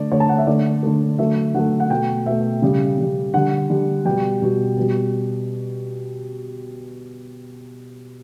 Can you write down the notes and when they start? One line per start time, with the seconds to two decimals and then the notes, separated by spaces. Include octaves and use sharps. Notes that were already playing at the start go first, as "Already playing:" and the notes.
Already playing: D3 A3 D5
0.12 D3 A3 C#5
0.20 A5
0.29 F#5
0.38 E5
0.47 D3 A3 D5
0.83 D3 A3
1.19 D3 F#3 A3 E5
1.55 D3 F#3 A3 F#5
1.80 F#5
1.90 B2 A3 G5
2.26 B2 A3 E5
2.62 C#3 G3
2.98 C#3 G3
3.34 D3 G3 F#5
3.70 D3 G3
4.05 B2 G3 G5
4.41 B2 G3
4.77 B2 G3